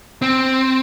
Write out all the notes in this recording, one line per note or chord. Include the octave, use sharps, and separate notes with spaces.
C4